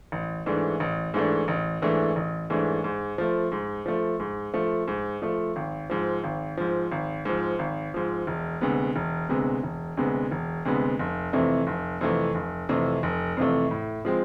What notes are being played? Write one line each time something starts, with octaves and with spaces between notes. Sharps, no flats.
A1
G#2 E3 A3 D4
A1
G#2 E3 A3 D4
A1
G#2 E3 A3 D4
A1
G#2 E3 A3 D4
G#2
F3 A3
G#2
F3 A3
G#2
F3 A3
G#2
F3 A3
G#1
G#2 F3
G#1
G#2 F3
G#1
G#2 F3
G#1
G#2 F3
E1
D2 C3 G#3 B3
E1
D2 C3 G#3 B3
E1
D2 C3 G#3 B3
E1
D2 C3 G#3 B3
F1
F2 C3 E3 A3
F1
F2 C3 E3 A3
F1
F2 C3 E3 A3
F1
F2 C3 E3 A3
A2
F3 G#3 C4